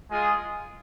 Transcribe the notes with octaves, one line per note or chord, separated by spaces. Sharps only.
G#3 F4 G#4